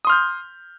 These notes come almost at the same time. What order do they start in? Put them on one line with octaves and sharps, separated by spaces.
D#6 C6 F6 G6